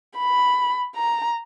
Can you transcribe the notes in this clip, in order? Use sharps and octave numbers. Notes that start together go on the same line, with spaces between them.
B5
A#5